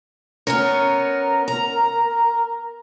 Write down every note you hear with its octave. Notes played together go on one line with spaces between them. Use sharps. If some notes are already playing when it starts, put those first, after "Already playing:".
B3 C#4 A#4 C#5
A#5